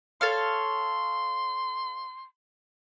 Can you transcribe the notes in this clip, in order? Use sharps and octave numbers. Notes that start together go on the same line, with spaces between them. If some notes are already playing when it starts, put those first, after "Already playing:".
A4 C#5 F5 C6